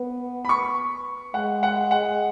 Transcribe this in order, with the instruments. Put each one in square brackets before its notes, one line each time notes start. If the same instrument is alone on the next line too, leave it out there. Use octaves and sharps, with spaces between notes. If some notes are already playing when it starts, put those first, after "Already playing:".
Already playing: [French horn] B3
[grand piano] B5
C#6
[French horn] G#3 [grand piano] F#5
[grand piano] F#5
F#5